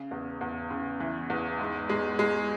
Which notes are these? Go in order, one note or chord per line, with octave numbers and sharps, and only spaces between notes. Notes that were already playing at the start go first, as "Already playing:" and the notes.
Already playing: C#3
E2
E2
C#3
E3
E2
G#2
G#3
G#3